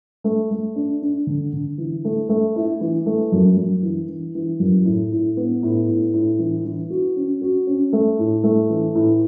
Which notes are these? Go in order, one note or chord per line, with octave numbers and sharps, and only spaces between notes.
A3
A3
D4
D4
D3
D3
E3
A3
A3
E4
E3
A3
F#2
F#2
E3
E3
E3
F#2
A2
A2
B3
A2
A2
A2
E3
E3
F#4
C#4
F#4
C#4
A3
A2
A3
E3
A2